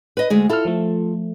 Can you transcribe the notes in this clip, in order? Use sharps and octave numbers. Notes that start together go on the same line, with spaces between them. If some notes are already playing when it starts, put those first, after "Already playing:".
B4 D#5
D2 G#3 G#4
E4 F4 A4 F6
F3 A3